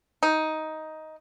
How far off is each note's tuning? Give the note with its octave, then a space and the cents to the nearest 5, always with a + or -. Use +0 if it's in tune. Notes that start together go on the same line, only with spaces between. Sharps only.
D#4 +10